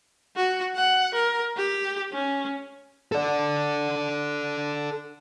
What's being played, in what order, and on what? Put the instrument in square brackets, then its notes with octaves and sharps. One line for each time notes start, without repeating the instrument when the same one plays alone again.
[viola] F#4
F#5
A#4
G4
C#4
[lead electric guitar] A4 D5